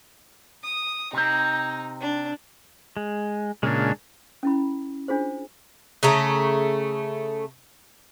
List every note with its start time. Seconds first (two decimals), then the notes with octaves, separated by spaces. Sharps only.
0.63 D#6
1.13 C3 C4 D#4
2.01 D4
2.97 G#3
3.63 A#2 C#3 G#3 D4
4.43 C#4 E4 B5
5.08 D4 F4 G#4 C5
6.03 C#3 A3 A#5